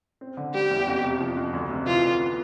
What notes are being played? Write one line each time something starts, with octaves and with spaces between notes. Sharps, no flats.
C4
D3
G3 G4
E2
F2
C3
F3
F2
D2
C3
E3 F4
D2
B3